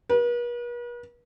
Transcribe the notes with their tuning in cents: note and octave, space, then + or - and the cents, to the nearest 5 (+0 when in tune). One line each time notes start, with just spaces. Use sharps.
B4 -45